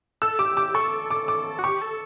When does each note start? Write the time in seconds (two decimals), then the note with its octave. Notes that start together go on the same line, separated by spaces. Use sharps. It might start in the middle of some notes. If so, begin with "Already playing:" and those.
0.22 A4 E6
0.39 G4 D6
0.57 G4 D6
0.74 A4 C#6
1.10 D6
1.28 D6
1.59 F#4
1.64 G4 C#6
1.82 A4